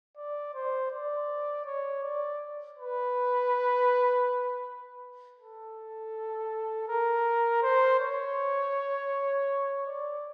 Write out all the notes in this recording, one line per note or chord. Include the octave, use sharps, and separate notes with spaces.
D5
C5
D5
C#5
D5
B4
A4
A#4
C5
C#5
D5